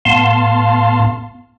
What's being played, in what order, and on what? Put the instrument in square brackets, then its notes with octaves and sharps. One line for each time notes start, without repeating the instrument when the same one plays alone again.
[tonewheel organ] A2 B3 F5 A5 C6